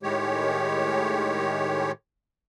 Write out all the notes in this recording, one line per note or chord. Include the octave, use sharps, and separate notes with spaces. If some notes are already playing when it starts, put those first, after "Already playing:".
A2 D#3 G#3 G4 C#5